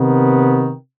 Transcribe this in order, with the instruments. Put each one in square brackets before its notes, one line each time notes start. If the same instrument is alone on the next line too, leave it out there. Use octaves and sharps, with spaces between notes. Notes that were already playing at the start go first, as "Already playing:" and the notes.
Already playing: [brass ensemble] C3 D#3 B3